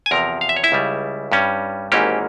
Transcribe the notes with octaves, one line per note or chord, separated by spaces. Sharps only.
G#5
E2 C3 F3 A#4 A#5
F5
E5
C#5
E4 E5
C#2 C#3 G3
G2 G3 C#4
G#1 G#2 E3 A#3 C#4 G4